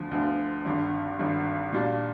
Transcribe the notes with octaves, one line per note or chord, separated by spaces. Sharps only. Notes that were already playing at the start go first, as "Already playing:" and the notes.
Already playing: D2 D3 F3
D2 D3 F3
G#1 G2 D3
G#1 G2 D3
A#2 G3 D4